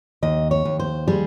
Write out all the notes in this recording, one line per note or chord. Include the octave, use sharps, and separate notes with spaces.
D#2 D#5
C#5
D#2
C5
G3 G#4